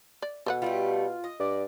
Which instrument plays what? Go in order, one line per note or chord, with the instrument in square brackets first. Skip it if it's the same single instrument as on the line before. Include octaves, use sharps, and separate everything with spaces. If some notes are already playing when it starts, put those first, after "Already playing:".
[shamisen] D5
[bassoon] B2 [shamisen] A4 B4 F#5
[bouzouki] G3 A3 G4 [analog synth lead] F4
[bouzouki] D#5
[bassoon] G2 [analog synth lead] D5